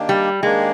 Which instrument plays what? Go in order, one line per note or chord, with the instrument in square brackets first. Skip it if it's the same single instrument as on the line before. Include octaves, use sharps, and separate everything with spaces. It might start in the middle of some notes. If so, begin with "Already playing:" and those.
Already playing: [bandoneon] D#3 A#3 D4 G4
[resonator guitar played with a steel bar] G3
[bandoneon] D#3 A#3 D4 G4 [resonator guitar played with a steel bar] G#3